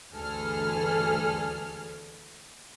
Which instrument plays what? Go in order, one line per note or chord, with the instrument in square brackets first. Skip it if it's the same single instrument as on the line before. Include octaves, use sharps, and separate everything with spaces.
[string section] G1 D2 E3 G#4 A4 F6